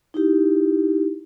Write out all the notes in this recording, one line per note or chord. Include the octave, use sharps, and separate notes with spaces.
D#4 E4 G4